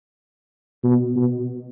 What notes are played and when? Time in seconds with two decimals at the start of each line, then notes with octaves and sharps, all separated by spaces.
0.84 B2
1.16 B2